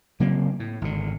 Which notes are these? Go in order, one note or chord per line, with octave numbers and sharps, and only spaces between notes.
C#3 F#3 A#3 C4
A2
G#1 D3